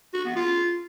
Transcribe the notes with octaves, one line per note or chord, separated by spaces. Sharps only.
F#4
B3
F4